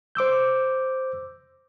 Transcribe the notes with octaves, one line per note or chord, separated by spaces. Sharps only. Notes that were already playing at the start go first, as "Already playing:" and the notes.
C5 D6 E6 G6